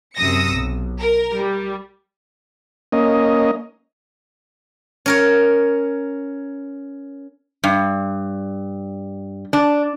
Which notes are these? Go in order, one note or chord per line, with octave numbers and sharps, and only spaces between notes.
F#2 C3 D#6 E6 A#6 C#7
B1
A#4
G3
A#3 C#4 D#5
C#4 A#4 C#5
G2
D4